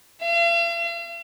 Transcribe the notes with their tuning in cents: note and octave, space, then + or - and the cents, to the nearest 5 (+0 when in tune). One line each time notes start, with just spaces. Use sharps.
F5 -45